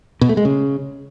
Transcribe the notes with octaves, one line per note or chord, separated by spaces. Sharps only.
B2
A3
G#3
C#3